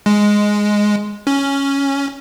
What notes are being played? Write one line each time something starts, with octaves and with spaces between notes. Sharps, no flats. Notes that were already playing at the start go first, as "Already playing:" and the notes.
G#3
C#4